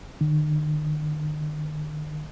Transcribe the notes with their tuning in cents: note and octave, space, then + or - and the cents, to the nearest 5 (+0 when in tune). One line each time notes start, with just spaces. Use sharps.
D#3 -45